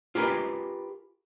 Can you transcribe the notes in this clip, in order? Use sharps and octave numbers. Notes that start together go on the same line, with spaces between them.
F4 G4 G#4 A#4 B4